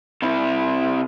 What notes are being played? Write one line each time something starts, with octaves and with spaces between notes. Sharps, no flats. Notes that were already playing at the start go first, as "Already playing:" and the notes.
C3 E4